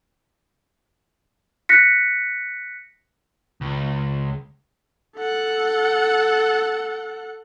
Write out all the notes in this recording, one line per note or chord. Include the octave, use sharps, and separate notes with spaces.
F#6 A#6 B6 C#7
C#2
A4 F#5